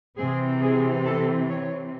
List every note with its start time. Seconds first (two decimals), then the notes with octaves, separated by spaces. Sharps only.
0.17 C3 E3 C4 G#4
0.61 G#4
1.04 A4
1.48 C#5